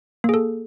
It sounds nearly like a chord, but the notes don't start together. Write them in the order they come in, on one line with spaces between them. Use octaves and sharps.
A#3 G#4 A4